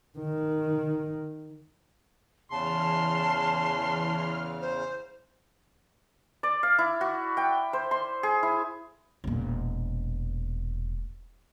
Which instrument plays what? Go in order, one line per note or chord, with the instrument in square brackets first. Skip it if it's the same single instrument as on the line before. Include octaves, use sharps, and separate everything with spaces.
[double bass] D#3
[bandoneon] E2 C#3 [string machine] E3 F6 [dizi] A5 [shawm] C6
[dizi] C5
[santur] D5
F5
E4
F#4
G5
C5
C6
G#4
E4
[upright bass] E1 A#2